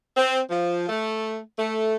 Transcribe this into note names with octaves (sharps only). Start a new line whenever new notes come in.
C4
F3
A3
A3